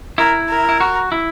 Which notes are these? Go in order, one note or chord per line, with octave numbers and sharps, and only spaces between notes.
E4 A#4
A#4
E4
F#4
E4